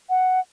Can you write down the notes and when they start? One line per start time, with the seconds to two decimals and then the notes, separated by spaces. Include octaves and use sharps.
0.09 F#5